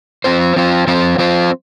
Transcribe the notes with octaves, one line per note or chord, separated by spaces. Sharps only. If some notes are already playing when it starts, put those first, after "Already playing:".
F3 C4 F4 C5
F3 C4 F4 C5
F3 C4 F4 C5
F3 C4 F4 C5